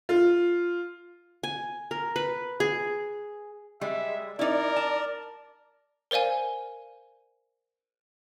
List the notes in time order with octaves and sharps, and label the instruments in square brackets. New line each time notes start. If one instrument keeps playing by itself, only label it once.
[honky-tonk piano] F4
[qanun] G#5
A#4
B4
G#4
[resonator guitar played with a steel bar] G3 G#3 [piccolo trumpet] E5
[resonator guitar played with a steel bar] D#4 E4 [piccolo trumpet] A#4 [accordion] D5
[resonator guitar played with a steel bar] A5
[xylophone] A#4 C5 D5 F5 G#5